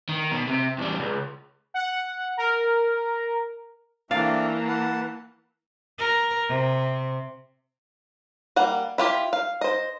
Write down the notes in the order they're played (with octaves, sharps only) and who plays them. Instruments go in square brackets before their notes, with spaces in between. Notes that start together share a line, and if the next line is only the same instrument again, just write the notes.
[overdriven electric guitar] D#3
B2
C3
E2 G3
C#2
[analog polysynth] F#5
A#4
[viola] E3 A#3 [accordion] A3 C4 D4 [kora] D5 F5
[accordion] B4 F#5 A5
[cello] A#4
C3
[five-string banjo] G3 A#3 F#5
E4 F4 G4
F5
C5 D#5